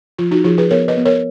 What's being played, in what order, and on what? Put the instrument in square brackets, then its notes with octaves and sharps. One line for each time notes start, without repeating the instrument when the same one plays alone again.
[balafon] F3 F4
D#4 F#4
F3 F4 G#4
G#4 B4
B3 A#4 C#5
B4 D#5
B3
A#4 C#5